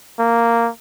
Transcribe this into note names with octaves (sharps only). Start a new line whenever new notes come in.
A#3